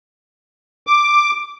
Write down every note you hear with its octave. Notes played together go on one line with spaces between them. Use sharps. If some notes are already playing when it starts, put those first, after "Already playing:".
D6